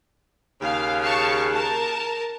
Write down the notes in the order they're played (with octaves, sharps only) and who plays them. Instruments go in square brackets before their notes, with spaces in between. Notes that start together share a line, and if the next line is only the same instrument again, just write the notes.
[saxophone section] D#2 C#3 [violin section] F5
[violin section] F5 A5 C#6
A#4 A5